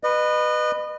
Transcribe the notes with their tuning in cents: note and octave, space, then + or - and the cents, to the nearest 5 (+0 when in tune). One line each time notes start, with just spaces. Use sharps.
B4 +0 D#5 -30